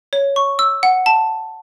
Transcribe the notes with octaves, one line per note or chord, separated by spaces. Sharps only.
C#5
C#6
E6
F#5
A5